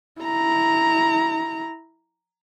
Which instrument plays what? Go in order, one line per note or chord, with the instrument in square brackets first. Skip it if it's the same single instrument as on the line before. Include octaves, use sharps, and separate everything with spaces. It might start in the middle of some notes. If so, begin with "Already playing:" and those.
[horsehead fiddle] E4 A#5